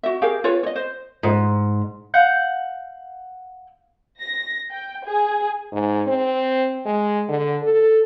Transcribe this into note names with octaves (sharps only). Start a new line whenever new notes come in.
F#4 E5
G4 G#4 A#4 F5
F4 B4 C#5 F5
C#5 D#5
C5
G#2
F5 F#5 G6
A#6
G5
G#4
G#2
C4
G#3
D3
A4